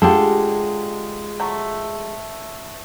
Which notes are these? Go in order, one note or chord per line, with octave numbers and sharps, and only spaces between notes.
D3 G#3 F4 G4 A4
F#3 A3